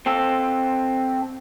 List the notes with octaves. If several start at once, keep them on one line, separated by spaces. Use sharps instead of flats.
C4 A4